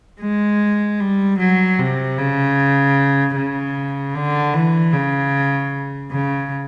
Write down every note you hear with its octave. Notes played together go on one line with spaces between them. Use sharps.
G#3
G3
F#3
C3
C#3
C#3
D3
E3
C#3
C#3